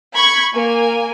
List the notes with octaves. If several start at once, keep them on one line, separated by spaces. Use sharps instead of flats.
B5 C#6 G#6
A#3 G#5